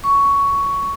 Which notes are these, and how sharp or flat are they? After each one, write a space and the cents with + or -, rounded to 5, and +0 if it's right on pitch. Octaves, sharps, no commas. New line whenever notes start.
C#6 +10